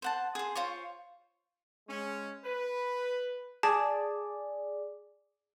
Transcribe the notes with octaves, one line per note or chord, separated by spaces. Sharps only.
C5 F#5 A5
G#4 C5
F4 C5 C#5 C#6
G#3 C#4
B4
G#4 D5 A5